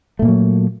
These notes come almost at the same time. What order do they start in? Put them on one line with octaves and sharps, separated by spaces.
A3 A#2 A#3 F#3